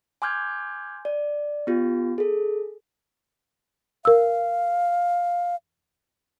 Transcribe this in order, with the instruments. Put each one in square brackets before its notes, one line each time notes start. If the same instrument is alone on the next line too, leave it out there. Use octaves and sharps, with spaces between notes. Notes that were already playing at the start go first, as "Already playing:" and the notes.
[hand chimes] G#5 C6 D6 F6 G6 G#6
D5
B3 F4 G4
G#4 A4
[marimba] A#4 E6 [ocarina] F5